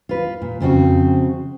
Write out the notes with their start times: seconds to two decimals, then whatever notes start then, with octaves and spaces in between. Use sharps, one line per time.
0.09 F4 B4
0.42 A#2
0.60 F2 C#3 C4 F#4